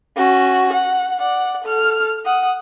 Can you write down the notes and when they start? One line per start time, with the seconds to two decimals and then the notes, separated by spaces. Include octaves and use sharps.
0.17 C#4 F#4
0.72 F#5
1.19 D5 F#5
1.64 A4 F6
2.25 F#5 D#6